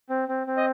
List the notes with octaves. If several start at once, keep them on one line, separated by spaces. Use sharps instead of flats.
C4
C4
C4
D#5